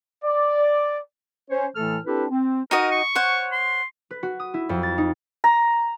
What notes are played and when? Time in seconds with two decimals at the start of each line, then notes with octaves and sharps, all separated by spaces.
0.24 D5
1.50 C#4 C5 C#5
1.75 A2 E3 A3 A4 A5 F6
2.05 C4 D4 E4 G4 A4 B4
2.30 C4
2.71 D#4 F#4 A#4 D#5
2.92 C#6
3.15 C5 C#5 F#5
3.52 C6
4.11 B4
4.23 F#4
4.40 D#6
4.54 E4
4.69 F2
4.83 A6
4.98 D#4
5.44 A#5